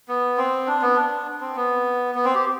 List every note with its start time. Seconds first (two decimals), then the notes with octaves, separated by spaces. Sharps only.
0.08 B3
0.38 C4
0.67 D4
0.82 B3
0.96 D4
1.41 C4
1.56 B3
2.15 B3
2.25 C4
2.35 G4